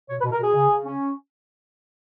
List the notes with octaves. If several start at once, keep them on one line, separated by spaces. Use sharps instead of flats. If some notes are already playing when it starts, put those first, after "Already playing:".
B2 C#5
B4
B2
A#4
B2 G#4
C#3
C#3
C#4